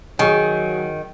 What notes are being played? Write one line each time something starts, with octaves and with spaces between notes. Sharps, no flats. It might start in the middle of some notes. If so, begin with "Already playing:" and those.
D#3 F#3 G#4 C#6